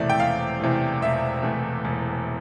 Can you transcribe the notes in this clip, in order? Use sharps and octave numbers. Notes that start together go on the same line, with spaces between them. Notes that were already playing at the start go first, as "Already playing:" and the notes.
Already playing: E1 E2 C3 E3 A3 D5 E5
G5
E1 F5
E2 C3 E3 A3
E1 E5
E2 C3 E3 A3
E1